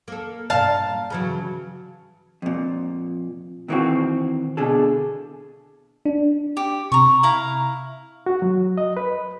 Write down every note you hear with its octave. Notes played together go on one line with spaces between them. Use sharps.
A#3 A4
G2 A#2 F5 A5
C#3 E3 F#3
F2 A#2
A#2 D#3 E3 A#3 C4 F#4
B2 D3 G#4 A4
D4
G4
C3 A#5 C#6
E4 F5 A#5
F#4
F#3
D#5
B4